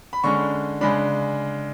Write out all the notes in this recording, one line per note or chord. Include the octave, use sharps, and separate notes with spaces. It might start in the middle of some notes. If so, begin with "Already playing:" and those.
B5
D3 G#3 C#4 C#6
C#3 G#3 D4 B5